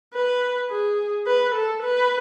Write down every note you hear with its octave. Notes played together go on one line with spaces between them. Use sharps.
B4
G#4
B4
A4
B4